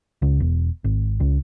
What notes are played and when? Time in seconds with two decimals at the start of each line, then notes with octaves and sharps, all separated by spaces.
0.22 C#2
0.40 E1
0.84 G#1
1.20 C#2